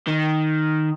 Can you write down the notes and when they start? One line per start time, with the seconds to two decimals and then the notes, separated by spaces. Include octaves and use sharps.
0.08 D#3